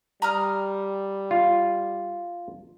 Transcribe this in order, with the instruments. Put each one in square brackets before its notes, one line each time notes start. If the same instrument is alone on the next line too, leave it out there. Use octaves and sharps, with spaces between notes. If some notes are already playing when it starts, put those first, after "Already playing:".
[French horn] G3 [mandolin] A#5 D#6 F6
[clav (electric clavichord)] F4